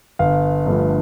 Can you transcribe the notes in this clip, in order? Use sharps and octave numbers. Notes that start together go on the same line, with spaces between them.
G1 F5
G2 D3 F3 A3